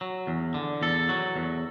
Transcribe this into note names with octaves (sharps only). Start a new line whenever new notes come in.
F#3
E2
D3
E2 A4
F#3
E2